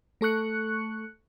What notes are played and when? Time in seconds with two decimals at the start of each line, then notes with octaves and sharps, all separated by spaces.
0.21 A3 A4 C#6 F#6 C#7